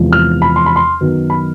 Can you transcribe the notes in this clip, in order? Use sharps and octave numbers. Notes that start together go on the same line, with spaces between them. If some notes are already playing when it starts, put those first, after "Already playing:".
Already playing: E2 C3 F3 G#3
F6
B5
C6
B5
C6
F#2 D#3 F#3 B3
B5